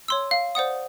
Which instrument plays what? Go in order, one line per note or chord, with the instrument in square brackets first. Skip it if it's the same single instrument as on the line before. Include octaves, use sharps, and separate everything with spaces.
[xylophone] C#5 C6 E6
F5
C5 D5 F#5 D#6